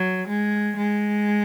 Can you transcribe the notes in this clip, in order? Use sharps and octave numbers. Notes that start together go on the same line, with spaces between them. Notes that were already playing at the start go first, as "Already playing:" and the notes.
Already playing: F#3
G#3
G#3